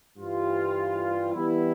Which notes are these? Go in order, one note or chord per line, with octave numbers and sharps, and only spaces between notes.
G2 E3 G3 C4 F4
E3 G3 B3 E4